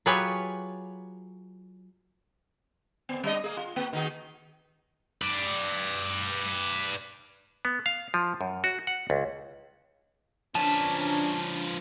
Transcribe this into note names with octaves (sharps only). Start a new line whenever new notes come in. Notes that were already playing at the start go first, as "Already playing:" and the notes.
F#3 F4 G4 G#4 B4 C#5
F2 B3
G3 D4 D#5
A#3 G#4
F4
A#3
D#3 F#4 G#4
B4 D5
B3
F5
F3
F#2
F#4
F#5
C#2
F3 C#4 D4 B4 A5 A#5